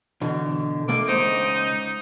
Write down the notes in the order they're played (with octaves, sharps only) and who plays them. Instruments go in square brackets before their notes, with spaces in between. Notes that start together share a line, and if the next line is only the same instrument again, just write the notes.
[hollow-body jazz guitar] B2 D3 E3
[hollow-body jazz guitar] B2 A3 A#3 [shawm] D6
[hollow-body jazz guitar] C#2 C5 [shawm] D#4